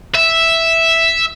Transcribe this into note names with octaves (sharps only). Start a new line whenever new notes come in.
E5